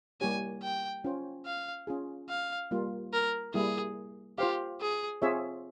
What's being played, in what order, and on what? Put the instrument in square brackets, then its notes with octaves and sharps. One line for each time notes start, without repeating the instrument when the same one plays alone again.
[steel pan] G3 A#3 E4 G4 C#5 [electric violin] G#5
[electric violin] G5
[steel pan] C#4 F4 C5 G5
[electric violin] F5
[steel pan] C#4 F4 G#4
[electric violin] F5
[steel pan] G3 A#3 F4
[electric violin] A#4
[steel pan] G3 A#3 E4 [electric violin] G#4
[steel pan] F4 C5 F5 [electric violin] G4
[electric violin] G#4
[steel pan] C4 F4 G#4 C#5 E5